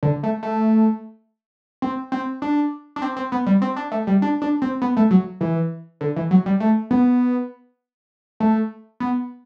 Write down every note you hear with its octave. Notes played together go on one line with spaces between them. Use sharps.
D3
A3
A3
C4
C4
D4
D4
C4
C4
B3
G3
C4
D4
A3
G3
D4
D4
C4
B3
A3
F#3
E3
D3
E3
F#3
G3
A3
B3
A3
B3